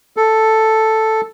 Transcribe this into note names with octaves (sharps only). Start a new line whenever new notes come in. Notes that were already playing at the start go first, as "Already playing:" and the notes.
A4